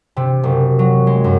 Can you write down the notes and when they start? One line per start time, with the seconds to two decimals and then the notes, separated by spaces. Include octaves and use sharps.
0.16 C3
0.44 F#1
0.79 F#3
1.07 G#3
1.24 F#2